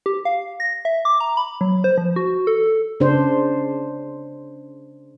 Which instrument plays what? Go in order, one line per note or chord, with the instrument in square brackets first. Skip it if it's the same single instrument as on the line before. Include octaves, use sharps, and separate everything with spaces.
[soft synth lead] G4
F5
A#6
E5
D6
A#5
B5
F#3
C5
F3
F#4
A4
[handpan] C#3 D4 C5